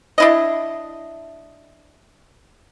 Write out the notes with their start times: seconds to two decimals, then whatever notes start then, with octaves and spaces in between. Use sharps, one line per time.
0.18 D4 E4 D#5